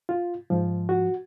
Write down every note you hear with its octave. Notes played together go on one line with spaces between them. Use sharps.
F4
G#2 F3
F#4